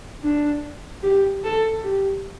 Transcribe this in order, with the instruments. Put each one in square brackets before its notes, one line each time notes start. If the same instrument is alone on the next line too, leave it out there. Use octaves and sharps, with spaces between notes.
[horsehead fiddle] D4
G4
A4
G4